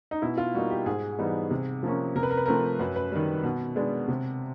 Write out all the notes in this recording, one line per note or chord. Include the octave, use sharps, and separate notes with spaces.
D#4
B2 E4
F4
G3 A#3 D#4 F#4
G4
G#2 G#4
E3 G3 B3 D#4
C3
F3 A#3 C#4
C3 A#4
B4
A#4
B4
F3 A3 C4 A#4
F#2 B4
B4
D#3 G3
B2
G#3 B3 D4
C3